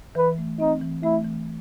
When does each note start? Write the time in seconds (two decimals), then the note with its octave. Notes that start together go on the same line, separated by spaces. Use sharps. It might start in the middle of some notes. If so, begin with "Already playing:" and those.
0.15 E3 B4
0.38 A3
0.59 C4 D#4
0.82 E3
1.03 A3 E4
1.25 E3